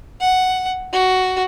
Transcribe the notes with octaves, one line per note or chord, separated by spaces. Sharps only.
F#5
F#4